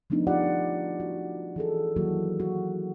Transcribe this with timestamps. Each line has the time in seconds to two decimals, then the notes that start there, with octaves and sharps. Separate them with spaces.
0.10 F3 A3 B3 D4 D#4
0.27 F4 G4 D5 F#5
1.00 F#4
1.56 E3 G#4 A4
1.96 D#3 E3 F#3 A#3 F#4
2.40 F#4